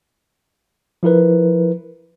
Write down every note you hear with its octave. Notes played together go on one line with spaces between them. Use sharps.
F3 E4 A#4 B4